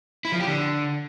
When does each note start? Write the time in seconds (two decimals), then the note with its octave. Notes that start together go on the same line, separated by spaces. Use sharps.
0.25 E4
0.32 F3
0.40 G4
0.47 D3